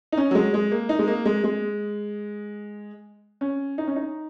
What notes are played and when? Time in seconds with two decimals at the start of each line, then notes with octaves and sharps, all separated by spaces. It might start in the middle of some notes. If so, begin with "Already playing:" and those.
0.12 D#4
0.17 C#4
0.31 F#3
0.35 G#3
0.54 G#3
0.72 A#3
0.89 D#4
0.99 G#3
1.08 A#3
1.26 G#3
1.44 G#3
3.41 C#4
3.78 D#4
3.88 C#4
3.96 D#4